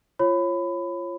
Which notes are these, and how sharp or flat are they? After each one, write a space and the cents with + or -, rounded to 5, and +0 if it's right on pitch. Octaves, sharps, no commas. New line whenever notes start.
F4 -15 C#5 -25 B5 +20